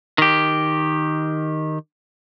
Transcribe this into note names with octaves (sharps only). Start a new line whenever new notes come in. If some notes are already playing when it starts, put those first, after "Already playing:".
D#3 G4